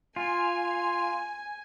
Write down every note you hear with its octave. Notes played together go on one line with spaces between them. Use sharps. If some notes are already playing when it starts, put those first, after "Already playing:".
F4 G#5